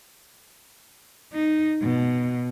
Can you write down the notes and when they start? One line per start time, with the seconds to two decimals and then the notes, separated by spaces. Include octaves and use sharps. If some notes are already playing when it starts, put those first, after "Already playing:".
1.33 D#4
1.83 B2